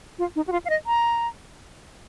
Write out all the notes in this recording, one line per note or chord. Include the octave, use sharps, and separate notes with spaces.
F4
D#4
F#4
F4
F5
D#5
A#5